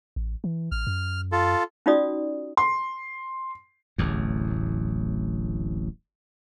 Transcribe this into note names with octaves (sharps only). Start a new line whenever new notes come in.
A1
E3
A1 F6
F#2
F4 A4
C#4 D#4 F4 F#4 D5 D#6
C6
D1 A1 E2